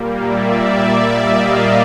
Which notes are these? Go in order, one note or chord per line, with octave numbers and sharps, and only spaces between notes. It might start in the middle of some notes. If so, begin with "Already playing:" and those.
Already playing: A#2 G3 A#3
D5 E5
D#5 F5